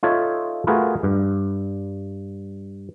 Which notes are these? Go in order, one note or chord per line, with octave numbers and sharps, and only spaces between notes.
D#4 F4 A4 C#5 E5
A3 F4 F#4 G#4 A#4 B4
G2